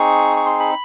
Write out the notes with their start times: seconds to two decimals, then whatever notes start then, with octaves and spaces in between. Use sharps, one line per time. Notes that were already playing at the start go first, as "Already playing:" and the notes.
Already playing: C4 D#4 G#4 C#6
0.36 C#6
0.46 C6
0.60 B5